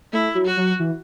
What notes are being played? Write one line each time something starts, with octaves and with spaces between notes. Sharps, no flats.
A3 E4
F#3
F#4
F#3
E3